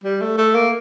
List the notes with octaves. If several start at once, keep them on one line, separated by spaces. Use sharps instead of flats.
G3
A3
A3
A#3